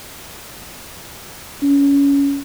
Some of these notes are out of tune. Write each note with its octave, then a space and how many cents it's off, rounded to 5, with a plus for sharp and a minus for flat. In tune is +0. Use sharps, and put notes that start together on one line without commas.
C#4 +20